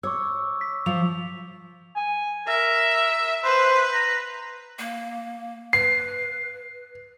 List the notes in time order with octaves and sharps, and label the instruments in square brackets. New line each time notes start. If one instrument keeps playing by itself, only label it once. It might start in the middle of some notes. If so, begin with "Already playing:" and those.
[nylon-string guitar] C#5 [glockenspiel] C#6 D6 E6
[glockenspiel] B6
[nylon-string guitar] F3 [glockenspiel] F7
[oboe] G#5
[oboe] A#4 [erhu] E5
[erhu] B4 [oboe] C5
[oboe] A#5
[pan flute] A#3
[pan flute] B4 [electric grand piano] C7